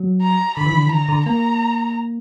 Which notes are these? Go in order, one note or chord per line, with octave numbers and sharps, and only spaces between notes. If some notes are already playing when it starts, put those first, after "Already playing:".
Already playing: F#3
A#5
D3 B5
E3
D3
E3
D3 A#5
D3
A#3 A#5